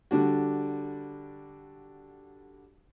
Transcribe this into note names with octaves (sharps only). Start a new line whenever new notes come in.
D3 G3 D4 F#4